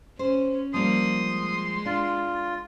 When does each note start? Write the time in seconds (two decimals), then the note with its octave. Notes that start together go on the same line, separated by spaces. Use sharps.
0.19 C#4 C5
0.74 F3 G3 A#3 C6 D#6
1.22 G#3
1.86 D4 F4